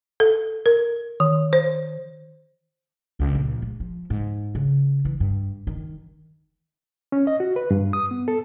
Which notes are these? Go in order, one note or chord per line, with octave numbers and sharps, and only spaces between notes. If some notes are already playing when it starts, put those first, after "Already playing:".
A4
A#4
D#3
C5
C#2
A#1
G#3
F3
G#2
C#3
E3
G2
D#3
C#4
D#5
F#4
B4
G2
D#6
B3
A4